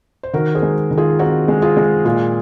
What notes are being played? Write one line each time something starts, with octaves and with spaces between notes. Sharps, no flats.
C5
D#3 F#4 A#4
G#4 C5
G#3
D#3
F4 G#4
C4 D#4 F#4
G#3
F4 G#4
G#3
A#2 F4 G#4